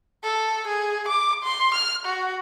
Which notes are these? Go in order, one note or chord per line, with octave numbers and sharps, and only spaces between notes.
A4
G#4
D6
C6
F6
F#4